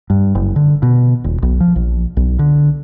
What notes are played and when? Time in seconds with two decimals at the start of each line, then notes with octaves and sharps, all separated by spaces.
0.10 G2
0.35 F#1
0.56 D3
0.83 B2
1.24 D#1
1.42 B1
1.60 F3
1.76 A#1
2.17 B1
2.39 D3